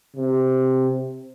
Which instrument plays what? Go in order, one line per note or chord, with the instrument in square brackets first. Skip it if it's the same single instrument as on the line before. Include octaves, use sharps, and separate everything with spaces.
[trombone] C3